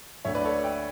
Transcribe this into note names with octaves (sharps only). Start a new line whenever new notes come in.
D2 D3 C#5 E5
B4 D5
A4 C#5
E5 G5